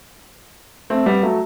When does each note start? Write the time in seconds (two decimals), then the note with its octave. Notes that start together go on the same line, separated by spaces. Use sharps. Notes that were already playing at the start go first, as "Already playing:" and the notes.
0.90 A3 C4
1.06 G3 B3
1.23 F#3 A3